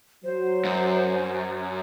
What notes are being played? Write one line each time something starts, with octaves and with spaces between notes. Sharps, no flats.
F#3 C5
F#2